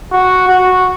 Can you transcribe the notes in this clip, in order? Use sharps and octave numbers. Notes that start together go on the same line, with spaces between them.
F#4
F#4